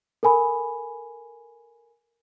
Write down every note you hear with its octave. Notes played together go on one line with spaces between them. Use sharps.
A4 A#4 G#5 B5